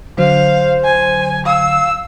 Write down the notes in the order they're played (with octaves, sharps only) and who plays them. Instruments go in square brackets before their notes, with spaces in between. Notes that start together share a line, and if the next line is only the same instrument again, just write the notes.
[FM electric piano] D3 F#3 [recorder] C5 [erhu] F5
[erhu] G#5
[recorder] F5 [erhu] E6